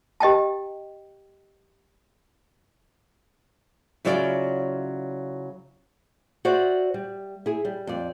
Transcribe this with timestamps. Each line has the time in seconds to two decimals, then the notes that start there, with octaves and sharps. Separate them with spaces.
0.20 G4 D#5 G5 A5
4.05 C#3 F#3 E4 F4 D5
6.45 F#4 C5 D5 E5
6.94 G3
7.46 E4 G#4
7.65 G3
7.87 F2 D5